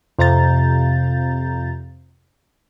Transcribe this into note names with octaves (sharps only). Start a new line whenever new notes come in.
F2 C3 F5 A#5 G6 A6